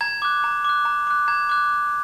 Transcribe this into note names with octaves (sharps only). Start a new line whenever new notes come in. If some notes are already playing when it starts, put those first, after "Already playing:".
A#5 G#6
D6 F#6
A#5
D6 F#6
A#5
D6 F#6
A#5 G#6
D6 F#6